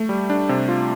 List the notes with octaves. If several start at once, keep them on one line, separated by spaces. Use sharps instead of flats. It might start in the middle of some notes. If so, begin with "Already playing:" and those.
Already playing: A3
G3
D4
C3
F4